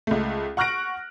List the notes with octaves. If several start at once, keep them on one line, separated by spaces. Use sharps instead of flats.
C#2 A3
F#5 C#6 F6 F#6 A#6 D7